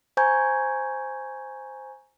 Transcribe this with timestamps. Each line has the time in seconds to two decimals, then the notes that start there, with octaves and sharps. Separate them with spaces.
0.17 C5 G#5 A#5 C#6 G6 G#6